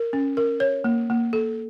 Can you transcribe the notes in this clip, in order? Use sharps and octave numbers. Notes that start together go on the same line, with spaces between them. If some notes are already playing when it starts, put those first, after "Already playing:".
Already playing: A#4
C#4
A#4
C#5
A#3
A#3
A4